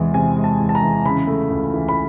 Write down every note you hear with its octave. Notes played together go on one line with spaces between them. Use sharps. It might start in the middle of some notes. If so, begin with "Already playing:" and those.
Already playing: E2 C3 E3 G#3
C3 G#5
G#3
A5
E2
A5
A#5
E3
C#3 B5
A3
C#2
E3
B5